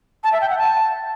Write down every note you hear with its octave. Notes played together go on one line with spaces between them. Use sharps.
A5
E5
G5
F#5
A5